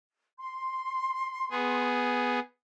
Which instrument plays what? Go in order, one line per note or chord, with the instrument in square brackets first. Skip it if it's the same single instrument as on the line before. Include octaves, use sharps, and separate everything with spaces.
[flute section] C6
[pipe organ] B3 G#4